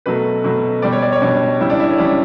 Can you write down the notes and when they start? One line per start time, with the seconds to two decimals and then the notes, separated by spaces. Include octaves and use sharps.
0.06 B2 F#3 A3 B4
0.44 B2 F#3 A3
0.82 B2 G3 D5
0.93 C#5
1.02 D5
1.12 C#5
1.21 B2 G3 D4
1.60 C#3 G3 E4
1.70 D4
1.79 E4
1.89 C#4
1.98 C#3 G3 D4